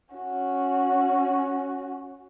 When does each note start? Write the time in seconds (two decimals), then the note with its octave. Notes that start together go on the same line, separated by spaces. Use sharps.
0.14 C#4 F#4